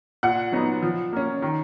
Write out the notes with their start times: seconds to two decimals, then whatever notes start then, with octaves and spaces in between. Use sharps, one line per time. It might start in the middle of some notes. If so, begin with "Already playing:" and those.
0.23 A#2 F#5
0.52 F#3 B3 D#4
0.83 F3
1.12 A#3 C#4
1.42 D#3